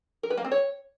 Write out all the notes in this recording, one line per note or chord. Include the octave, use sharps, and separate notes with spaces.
A#4
B4
A#3
C4
C#5